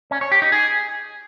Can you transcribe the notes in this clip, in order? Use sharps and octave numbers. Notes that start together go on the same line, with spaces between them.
C#4
C#5
G4
D#4
G#4